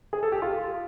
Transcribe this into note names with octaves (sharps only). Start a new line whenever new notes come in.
G#4
A4
G4
F4